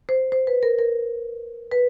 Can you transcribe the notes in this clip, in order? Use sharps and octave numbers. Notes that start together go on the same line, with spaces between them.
C5
C5
B4
A#4
A#4
B4